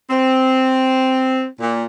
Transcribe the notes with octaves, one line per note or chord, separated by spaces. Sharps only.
C4
A#2